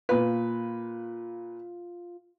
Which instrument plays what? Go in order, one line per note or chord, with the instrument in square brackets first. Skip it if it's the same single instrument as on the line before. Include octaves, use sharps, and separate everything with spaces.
[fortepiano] A#2 B4 [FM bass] F4